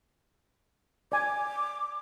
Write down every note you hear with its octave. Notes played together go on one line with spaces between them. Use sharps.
D5 G#5 D6